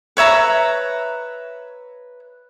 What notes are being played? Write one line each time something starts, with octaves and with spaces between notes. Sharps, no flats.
B4 C#5 E5 A#5